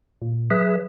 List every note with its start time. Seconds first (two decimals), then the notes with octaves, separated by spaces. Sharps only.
0.22 A#2
0.51 F#3 G#4 B4 E5